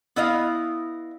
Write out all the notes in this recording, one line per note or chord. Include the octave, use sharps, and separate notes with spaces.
B3 E4 D#5 F5